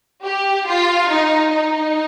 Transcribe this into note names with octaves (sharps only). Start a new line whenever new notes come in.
G4
F4
D#4
D#4